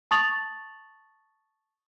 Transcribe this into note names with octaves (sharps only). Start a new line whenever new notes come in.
A5 C#6 D#6 A6 F7 F#7